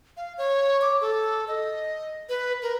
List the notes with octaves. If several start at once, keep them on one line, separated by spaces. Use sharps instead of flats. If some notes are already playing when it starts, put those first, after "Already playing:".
F5
C#5
D6
A4
D#5
B4
A#4